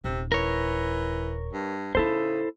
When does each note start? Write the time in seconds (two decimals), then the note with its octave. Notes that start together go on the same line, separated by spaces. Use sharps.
0.04 D#1 C3
0.32 E3 A#4 C#5
1.53 G2
1.95 C#3 B3 D#4 E4 A4 C5